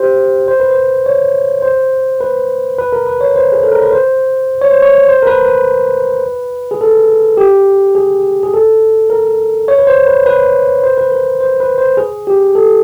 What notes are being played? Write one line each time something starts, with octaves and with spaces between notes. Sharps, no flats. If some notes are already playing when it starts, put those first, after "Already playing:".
Already playing: G4 C5
C5
B4
C5
C#5
C5
B4
B4
A#4
B4
C#5
C5
G#4
A4
A#4
B4
C5
C#5
C5
C#5
C5
A#4
B4
B4
G#4
A4
G4
G#4
G#4
A4
A#4
C#5
B4
C5
B4
B4
C5
B4
A#4
C5
B4
C5
G#4
G4
A4